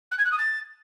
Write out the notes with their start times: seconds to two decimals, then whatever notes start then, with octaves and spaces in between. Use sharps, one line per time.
0.11 F#6
0.18 G#6
0.24 F#6
0.31 D#6
0.38 A6